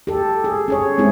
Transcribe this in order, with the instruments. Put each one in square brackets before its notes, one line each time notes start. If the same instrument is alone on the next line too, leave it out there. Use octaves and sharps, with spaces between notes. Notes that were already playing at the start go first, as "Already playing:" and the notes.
[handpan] G4 A4
G#4
C#4 G#4 C#5
G#3 B3 C4 E4 G#4